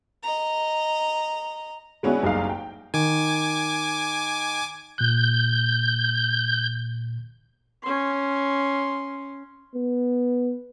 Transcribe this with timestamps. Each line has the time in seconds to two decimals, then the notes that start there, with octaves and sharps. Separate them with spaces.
0.23 D#5 A#5
2.03 G#3 B3 C#4 D4 E4 F#4
2.22 F#1 C2 D#4 F5
2.49 G5
2.94 D#3 G#5 D6
4.98 A#2 F#6 G6
7.83 C#4 C6
9.75 B3